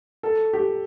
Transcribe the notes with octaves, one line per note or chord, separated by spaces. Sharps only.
A4
G4